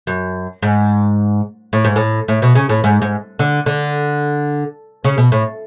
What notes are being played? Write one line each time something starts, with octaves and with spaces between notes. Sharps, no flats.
F#2
G#2
A2
G#2
A2
A2
B2
C#3
A2
G#2
G#2
D3
D3
C#3
B2
A2